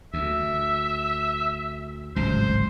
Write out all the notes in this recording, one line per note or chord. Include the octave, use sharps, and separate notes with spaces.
D2 E5
D1 G#1 C#2 C5